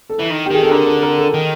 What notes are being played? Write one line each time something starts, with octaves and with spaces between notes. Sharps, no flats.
A4
E3
D#3
G4
D#3 G#4
A4
D3 A#4
A4
A#4
A4
D#3